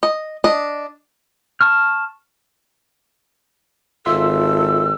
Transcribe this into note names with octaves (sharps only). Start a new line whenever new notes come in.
D#5
D4 D#5
A5 C#6 F6
G#1 F4 A4 E5 C6 E6